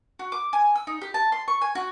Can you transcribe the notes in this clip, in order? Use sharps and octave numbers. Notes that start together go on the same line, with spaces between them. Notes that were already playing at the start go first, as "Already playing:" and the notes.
F#4
D6
G#5
E6
D#4
G4
A5
C6
C#6
G#5
F#4